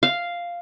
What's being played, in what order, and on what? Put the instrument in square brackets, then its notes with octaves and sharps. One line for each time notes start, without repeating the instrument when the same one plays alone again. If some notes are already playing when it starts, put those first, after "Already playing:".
[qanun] F5